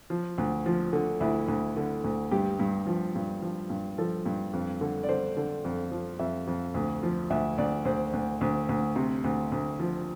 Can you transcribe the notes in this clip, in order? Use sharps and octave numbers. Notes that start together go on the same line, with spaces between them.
F3
D2
F3
D3
D2 E4
D2
D3
D2
G2 G4
G2
F3
G2
F3
G2
F3 A4
G2
F2
D3
D5
D3 C5
D3
F2
F3
F2 E5
F2
D2
F3
D2 E5
D2 D5
D2 C5
D2
D2
D2
C3
D2
D2
F3